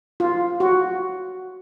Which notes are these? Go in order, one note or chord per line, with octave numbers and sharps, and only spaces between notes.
F4
F#4